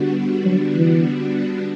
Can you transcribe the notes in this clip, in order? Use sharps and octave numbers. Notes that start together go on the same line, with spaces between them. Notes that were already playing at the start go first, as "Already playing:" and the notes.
Already playing: D3 G3 B3 D4 F#4
F#3
E3